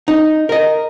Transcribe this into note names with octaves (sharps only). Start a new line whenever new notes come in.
D#4
A#4 D#5